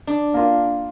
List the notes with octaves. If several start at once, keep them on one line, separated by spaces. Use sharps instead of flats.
D4
A#3 F4